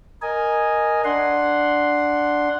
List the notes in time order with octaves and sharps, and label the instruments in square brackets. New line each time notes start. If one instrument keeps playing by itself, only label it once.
[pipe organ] A#4 D#5 G#5
D4 F#5 C6